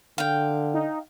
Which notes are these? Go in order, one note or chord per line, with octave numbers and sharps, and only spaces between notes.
D3 F5 G5
D#4